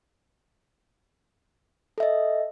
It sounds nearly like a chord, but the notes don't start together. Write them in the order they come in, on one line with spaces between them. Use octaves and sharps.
A4 E5 D#5